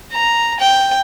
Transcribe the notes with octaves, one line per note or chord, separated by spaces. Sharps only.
A#5
G5